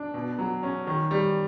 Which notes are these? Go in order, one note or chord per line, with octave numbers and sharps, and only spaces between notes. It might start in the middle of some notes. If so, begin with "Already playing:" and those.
Already playing: D4
B2
F#3
C#4
D#3
G3